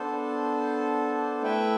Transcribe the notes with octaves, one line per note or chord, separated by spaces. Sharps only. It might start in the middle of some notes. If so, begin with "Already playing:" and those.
Already playing: B3 D4 A4 C5
A3 E4 B4 E5 G5